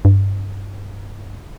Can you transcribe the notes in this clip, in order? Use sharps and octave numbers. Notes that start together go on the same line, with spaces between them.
G2